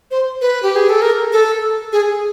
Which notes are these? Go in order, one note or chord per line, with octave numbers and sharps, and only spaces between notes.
C5
B4
G4
G#4
A4
A#4
A4
G#4